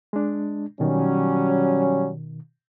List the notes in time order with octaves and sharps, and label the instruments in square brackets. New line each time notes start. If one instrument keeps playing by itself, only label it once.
[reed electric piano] G#3 D4
[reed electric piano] B2 D#3 [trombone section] F#3 G3 C#4